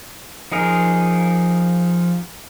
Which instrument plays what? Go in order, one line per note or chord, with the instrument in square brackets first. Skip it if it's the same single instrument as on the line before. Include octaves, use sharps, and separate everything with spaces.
[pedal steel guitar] F3 D#4 G#4 A#4